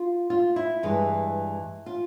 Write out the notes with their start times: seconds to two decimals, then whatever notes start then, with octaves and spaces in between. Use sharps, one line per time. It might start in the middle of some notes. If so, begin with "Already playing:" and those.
Already playing: F4
0.30 F4
0.56 E4
0.83 G2 E3 G#3
1.86 F4